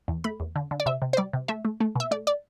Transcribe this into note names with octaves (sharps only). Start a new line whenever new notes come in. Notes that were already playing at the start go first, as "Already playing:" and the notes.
E2
A3 B5
E2
D3
D3
D5
C3 E5
C3
C5
G3 D5
C3
A3 E5
A3
A3
B2 E5
A3 D5
D5